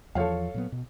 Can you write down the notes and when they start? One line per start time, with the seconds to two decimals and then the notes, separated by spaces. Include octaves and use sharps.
0.15 E2 F3 A4 C#5 F5
0.54 A#2 F#3 B3
0.72 B2